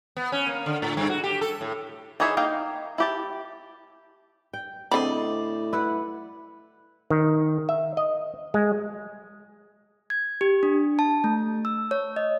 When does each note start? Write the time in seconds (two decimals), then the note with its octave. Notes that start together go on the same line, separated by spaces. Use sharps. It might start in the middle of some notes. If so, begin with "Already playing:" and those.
0.17 B3
0.32 C#4
0.47 A#3
0.66 D3
0.82 A2
0.97 G2
1.10 F#4
1.24 G4
1.41 A4
1.61 A2
2.20 E3 D#4 G#4 C#5 E5
2.37 A#3 D#4 F5 G5
2.98 E4 G4 A5
4.53 G5
4.92 A2 D3 C4 D5 D#5 B5
5.73 E4 B4 F#5
7.10 D#3
7.69 E5
7.97 D#5
8.54 G#3
10.10 G#6
10.41 G4
10.63 D4
10.99 A5
11.24 A3
11.65 E6
11.91 C#5
12.16 D#5